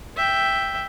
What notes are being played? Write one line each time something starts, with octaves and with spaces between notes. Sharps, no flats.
E5 G5